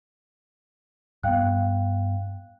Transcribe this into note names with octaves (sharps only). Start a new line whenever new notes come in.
G2 B3 F5 G5 F#6